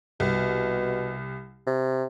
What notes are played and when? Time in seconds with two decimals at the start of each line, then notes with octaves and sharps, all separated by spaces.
0.20 C2 B2
1.67 C3